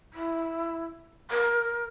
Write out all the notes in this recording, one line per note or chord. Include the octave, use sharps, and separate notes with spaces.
E4
A#4